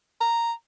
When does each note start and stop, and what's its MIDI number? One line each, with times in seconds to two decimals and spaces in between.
0.21 0.52 82